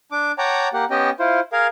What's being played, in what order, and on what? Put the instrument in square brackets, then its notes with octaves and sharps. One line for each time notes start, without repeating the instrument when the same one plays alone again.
[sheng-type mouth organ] D4 D6
C#5 F#5 G5 A5 A#5 D6
A#3 G4 F#5
B3 C#4 G4 D#5 G5
E4 F4 C5
G#4 A#4 F5